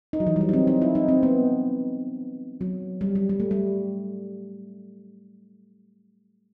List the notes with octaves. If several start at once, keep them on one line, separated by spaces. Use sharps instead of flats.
D#4
F#3
E3
G3
F#3
D#4
C4
D#4
E4
D#4
C4
B3
F#3
G3
G3
G3
A3
G3